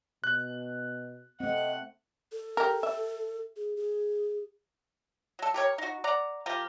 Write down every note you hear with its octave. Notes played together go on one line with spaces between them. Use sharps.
B2 F#6
A3 C4 D#5 F#5
A4
G4 A#4
E5
G#4
G#4
F#3 A4
G4 A#4 C#5
D#4 F#4
D5 F#5 A#5
F3 G4 A#4